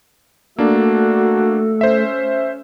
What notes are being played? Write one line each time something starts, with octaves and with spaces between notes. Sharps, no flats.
A3 A#3 D4 F#4 A4
C#4 C5 E5